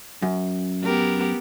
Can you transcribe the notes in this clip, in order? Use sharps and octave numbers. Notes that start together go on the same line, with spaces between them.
F#2
B3 G4 A#4